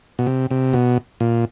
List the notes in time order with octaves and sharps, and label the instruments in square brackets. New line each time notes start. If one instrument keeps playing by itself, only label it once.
[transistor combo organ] B2
C3
C3
B2
A#2